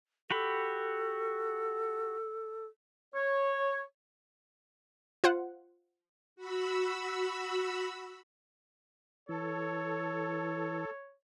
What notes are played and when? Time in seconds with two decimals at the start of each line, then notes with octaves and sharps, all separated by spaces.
0.31 F#4 G4 A4 B5
3.15 C#5
5.24 F4 C5 F#5
6.36 F#4 B5 E6
9.29 E3 A4 C#5